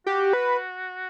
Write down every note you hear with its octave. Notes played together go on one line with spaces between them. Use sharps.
F#4 G4
B4